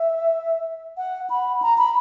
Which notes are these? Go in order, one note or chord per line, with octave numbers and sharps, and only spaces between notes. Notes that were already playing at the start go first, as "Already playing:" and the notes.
Already playing: E5
F#5
B5
A#5
B5